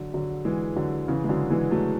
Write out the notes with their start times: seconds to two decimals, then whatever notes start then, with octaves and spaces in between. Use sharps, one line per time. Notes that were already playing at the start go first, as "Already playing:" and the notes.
Already playing: D3 F#3
0.14 D3 F#3
0.45 E3 G#3
0.76 D3 F#3
1.08 C#3 E3
1.24 G#3
1.29 D3 F#3
1.50 E3 G#3
1.71 F#3 A3